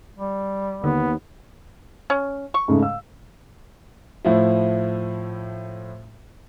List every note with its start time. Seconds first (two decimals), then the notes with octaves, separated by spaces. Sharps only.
0.18 G3
0.84 D#2 D3 B3
2.10 C#4
2.54 C#6
2.68 G#2 C#3 A3
2.82 F5 E6
4.25 A2 F3 E4